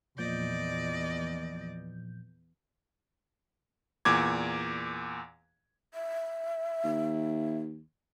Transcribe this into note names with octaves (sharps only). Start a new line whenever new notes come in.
E2 A#2 F3 D5 D#5 G6
E2 A#2 D6 G#6
E5
D#2